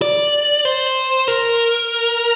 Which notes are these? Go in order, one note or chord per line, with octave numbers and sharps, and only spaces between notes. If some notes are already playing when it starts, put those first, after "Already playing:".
D5
C5
A#4